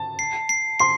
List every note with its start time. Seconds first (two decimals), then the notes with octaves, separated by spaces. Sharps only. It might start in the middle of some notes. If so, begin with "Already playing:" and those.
Already playing: A5
0.19 C7
0.49 C7
0.80 C6 C7